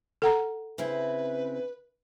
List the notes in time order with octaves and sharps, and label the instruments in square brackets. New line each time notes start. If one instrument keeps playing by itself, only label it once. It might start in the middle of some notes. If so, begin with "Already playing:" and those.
[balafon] A4 F#5 A#5
[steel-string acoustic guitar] C#3 C4 E4 [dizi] B4